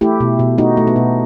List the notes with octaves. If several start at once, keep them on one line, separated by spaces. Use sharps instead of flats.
A3 E4 G4
B2
B2
A3 D#4 F#4
A3
B3
B2